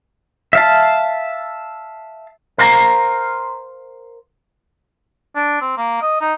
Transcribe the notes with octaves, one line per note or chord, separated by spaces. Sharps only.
E5 F5 A5
A#4 C5 F5 A5 A#5
D4
C4
A#3
D#5
D#4